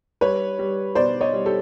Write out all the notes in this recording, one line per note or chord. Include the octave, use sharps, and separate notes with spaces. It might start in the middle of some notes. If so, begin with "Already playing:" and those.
G3 B4 C#5
G3
B2 C5 D5
C#5 D#5
G3
G4 A4